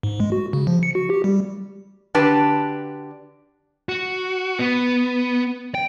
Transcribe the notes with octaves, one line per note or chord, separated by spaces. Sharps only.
G#2
G#3
F#4
C#3
F3
C#7
F#4
G4
G3
D3 D4 F#4 G4 B4 A5
F#4
B3
G5